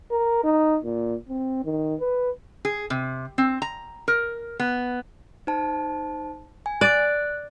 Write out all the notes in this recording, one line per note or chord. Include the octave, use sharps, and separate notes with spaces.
A#4
D#4
A#2
C4
D#3
B4
G#4
C3
C4
A#5
A#4
B3
D#4 C5 A5
G#5
D5 F#6